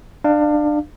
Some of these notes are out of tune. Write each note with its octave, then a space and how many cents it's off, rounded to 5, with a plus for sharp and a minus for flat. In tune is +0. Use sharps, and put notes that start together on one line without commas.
D4 +25 F5 +0